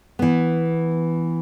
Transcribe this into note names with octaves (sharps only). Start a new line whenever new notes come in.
E3 B3